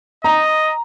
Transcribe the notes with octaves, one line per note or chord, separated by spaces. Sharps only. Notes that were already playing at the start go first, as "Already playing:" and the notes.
D#5 A#5